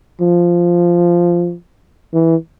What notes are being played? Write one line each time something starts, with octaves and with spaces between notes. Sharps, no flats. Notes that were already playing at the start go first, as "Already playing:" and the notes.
F3
E3